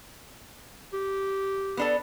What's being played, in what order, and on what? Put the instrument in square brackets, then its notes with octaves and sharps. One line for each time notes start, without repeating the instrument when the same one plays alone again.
[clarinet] G4
[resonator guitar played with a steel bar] B3 D4 A4